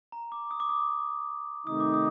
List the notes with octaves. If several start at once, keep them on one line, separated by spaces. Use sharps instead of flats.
A#5
D6
D#6
D6
D#6
C3 D#3 A3 D#4 D#6
D6
D#6